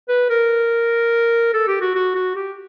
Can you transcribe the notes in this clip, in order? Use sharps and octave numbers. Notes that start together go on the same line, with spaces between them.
B4
A#4
A4
G4
F#4
F#4
F#4
G4